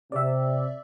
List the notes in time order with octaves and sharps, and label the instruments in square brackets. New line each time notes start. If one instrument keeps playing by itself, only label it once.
[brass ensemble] C3 [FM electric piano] D5 E5